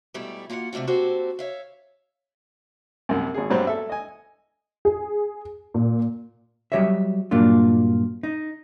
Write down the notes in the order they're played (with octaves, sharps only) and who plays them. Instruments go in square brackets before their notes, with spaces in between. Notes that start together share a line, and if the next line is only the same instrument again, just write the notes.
[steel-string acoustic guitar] G#2 B2 G3 A3 E4 G4
A#3 F4 F#4 F5 F#5
C3 A3 D4 F4 F#4
A#3 C4 F#4 G4 A4 C5
C#5 E5 F5
[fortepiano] C2 F#2
G#1 G#4
G2 B2 F#3 G3 C4
A4 E5
D#5 G#5
[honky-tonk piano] G#4
A#2
[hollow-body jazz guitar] F#3 G3 G4 C#5 D#5 E5
G2 A#2 F#3 A#3 D4 F4
D#4